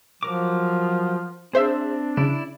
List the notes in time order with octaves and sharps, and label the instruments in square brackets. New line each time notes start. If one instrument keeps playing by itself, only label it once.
[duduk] F3 [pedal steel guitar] F#3 A#4 D6
[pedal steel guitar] C4 [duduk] D4 [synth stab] G#4 C5 E5
[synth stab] C#3 [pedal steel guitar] E4 D5